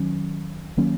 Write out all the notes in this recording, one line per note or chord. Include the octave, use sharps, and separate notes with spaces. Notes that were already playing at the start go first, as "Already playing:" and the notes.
Already playing: D#3 F#3 C#4
D#3 F#3 A#3 C#4